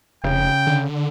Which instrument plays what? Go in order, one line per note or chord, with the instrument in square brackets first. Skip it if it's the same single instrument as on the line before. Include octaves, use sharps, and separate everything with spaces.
[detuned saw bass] F1 [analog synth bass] C#3 [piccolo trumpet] G5
[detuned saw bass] D3